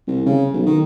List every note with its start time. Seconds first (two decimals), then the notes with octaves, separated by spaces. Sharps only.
0.07 C2
0.26 C#3
0.53 B1
0.66 D#3